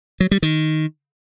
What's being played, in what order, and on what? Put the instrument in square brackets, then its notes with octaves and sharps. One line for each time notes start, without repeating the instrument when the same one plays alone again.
[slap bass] F#3
G3
D#3